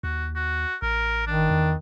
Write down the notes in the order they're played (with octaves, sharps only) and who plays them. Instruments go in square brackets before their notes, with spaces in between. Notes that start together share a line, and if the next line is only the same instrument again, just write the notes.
[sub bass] D#2 [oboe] F#4
[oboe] F#4
[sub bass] A1 [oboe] A#4
[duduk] D#3 [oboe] D4
[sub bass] E2